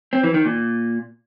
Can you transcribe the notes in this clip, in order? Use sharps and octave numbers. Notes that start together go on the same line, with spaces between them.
C4
E3
D#3
A#2